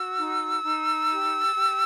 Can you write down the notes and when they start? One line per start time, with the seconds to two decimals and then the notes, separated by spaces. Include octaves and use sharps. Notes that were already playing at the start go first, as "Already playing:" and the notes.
Already playing: F#4 E6
0.17 D#4
0.63 D#4
1.11 G4
1.56 G4